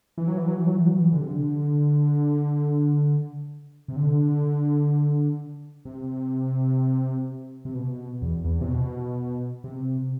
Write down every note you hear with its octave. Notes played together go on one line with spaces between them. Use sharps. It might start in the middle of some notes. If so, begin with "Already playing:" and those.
E3
F#3
E3
F#3
E3
F#3
E3
F#3
E3
D3
C3
D3
C3
D3
C3
C3
B2
E2
E2
C3
B2
C3